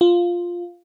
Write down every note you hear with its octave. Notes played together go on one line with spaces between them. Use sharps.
F4